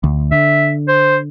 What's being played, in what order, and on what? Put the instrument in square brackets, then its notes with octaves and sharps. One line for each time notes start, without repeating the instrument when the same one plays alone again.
[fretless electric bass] D2
[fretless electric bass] D3 [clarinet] E5
[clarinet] C5